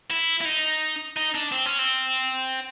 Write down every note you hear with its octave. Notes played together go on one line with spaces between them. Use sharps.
E4
E4
D#4
D#4
D4
C4
C#4
C4